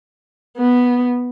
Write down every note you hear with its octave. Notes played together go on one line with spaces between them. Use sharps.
B3